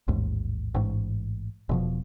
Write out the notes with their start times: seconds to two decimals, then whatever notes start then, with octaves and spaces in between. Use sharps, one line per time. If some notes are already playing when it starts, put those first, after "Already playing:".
0.08 A1 D#2 G#2
0.75 A1 G#2
1.69 E1 B2 F3